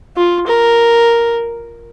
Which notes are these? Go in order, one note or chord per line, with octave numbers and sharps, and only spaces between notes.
F4
A#4